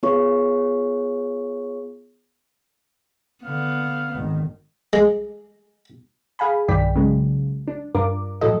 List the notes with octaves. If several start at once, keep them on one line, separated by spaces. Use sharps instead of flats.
B3 F4 G#4 C#5 C#6
D3 B3 F5
G#1 D#3
G#3
G#4 F5 G#5 B5
B1 G2 D#3 D5 G5 B6
C#3 F#3 G#3
D4
G2 D4 F4 A#4 D6
A2 F3 F#3 A4 D#5